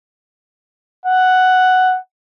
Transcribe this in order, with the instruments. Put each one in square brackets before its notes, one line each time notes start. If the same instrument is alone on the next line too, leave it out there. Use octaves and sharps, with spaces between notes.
[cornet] F#5